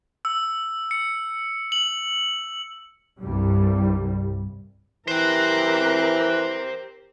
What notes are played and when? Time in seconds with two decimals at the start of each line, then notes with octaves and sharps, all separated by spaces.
0.25 E6
0.91 C#7
1.72 F#7
3.21 C2 G2 G3
5.08 E3 G4 A#4 C5 G5 F#6